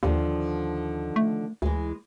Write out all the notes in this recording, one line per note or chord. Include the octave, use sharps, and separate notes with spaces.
D#2 D3 D#3 F3
A3
D2 E3 G#3